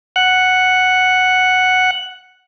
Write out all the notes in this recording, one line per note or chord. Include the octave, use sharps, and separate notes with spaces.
F#5 F#6